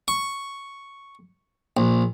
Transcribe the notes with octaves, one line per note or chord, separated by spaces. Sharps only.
C#6
A#1